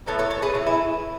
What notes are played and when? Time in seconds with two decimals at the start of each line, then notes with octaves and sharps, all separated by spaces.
0.06 A2 E3 B3 A4 C#5
0.19 A4 C#5
0.30 A4 C#5
0.42 G#4 B4
0.54 A2 E3 B3
0.66 E4